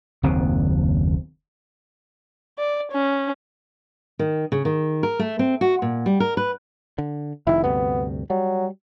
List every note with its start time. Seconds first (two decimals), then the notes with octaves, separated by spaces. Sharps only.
0.23 F#1 D#2 B2 C4
2.59 D5
2.92 C#4
4.19 D#3
4.52 C#3
4.65 D#3
5.03 A#4
5.19 A3
5.39 C4
5.61 F#4
5.82 A#2
6.06 G3
6.20 A#4
6.37 B4
6.98 D3
7.47 F1 D#3 E4
7.64 D2 G2 C3 B3
8.30 F#3 G3